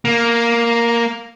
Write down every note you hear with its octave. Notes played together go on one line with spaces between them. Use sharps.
A#3